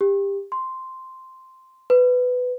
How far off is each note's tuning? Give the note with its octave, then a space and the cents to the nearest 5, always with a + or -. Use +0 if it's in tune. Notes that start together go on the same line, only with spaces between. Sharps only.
G4 +20
C6 -5
B4 +15